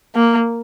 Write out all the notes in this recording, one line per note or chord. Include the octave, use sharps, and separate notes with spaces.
A#3